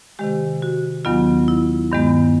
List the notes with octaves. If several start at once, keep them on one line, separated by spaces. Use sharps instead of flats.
C3 D#3 G#3 G4
F#4
D#2 D#3 F#3 B3 F4
E4
G2 D#3 G#3 B3